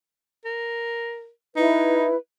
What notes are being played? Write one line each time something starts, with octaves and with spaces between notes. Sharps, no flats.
A#4
D#4 E4 B4